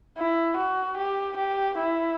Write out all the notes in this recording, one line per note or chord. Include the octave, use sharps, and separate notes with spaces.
E4
F#4
G4
G4
E4